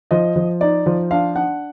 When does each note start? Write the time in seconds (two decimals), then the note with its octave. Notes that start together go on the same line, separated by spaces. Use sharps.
0.11 F3 D#5
0.36 F3
0.61 D#4 D5
0.86 F3
1.11 D4 F5
1.35 D4 F#5